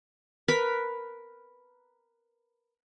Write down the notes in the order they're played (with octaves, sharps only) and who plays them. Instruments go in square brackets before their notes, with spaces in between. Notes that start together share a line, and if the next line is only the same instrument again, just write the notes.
[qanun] A#4 B4 B5